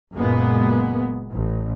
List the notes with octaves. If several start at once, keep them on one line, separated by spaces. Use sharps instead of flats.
F#1 A#2 G#3 A#3 B3
A1